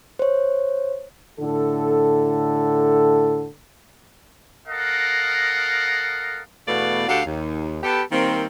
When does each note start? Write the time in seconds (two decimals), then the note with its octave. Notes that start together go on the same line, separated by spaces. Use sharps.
0.19 C5 C#5
1.39 A2 D3 A4
4.67 A4 A#4 D#5 F5 F#5
6.68 E2 B2 A3 B3 D5 F5
7.08 D2 D4 F#4 G4 A4 F5
7.25 D#2
7.83 B3 G4 A4
8.12 D#3 G3 A#3 C4